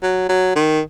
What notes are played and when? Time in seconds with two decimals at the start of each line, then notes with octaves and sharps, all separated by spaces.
0.03 F#3
0.29 F#3
0.56 D#3